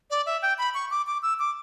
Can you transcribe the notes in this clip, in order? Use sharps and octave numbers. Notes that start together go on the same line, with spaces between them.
D5
E5
G5
B5
C#6
D6
D6
E6
D6